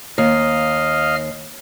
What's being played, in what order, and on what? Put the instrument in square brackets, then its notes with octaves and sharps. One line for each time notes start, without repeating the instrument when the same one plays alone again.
[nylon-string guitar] D#2 [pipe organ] D#5 F5 F6